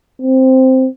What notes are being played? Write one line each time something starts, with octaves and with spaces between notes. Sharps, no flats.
C4